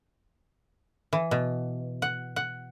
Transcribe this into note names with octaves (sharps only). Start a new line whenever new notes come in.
E3
B2
F#5
F#5